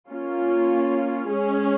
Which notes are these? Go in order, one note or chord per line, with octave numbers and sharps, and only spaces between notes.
A#3 C#4 F4
G#3 C#4 G#4